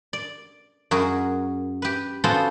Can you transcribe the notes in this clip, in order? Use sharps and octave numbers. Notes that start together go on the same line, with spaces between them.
D5
F#2 F#4 G#4 A#4
G4 B4
B3 C#4 F4 F#4 A4 C5